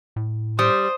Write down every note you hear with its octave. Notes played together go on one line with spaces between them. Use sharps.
A2
G3 C5 D#6